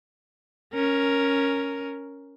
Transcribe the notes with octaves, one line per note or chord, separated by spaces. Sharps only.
C#4 A#4